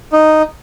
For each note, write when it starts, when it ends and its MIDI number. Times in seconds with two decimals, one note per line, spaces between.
0.13 0.42 63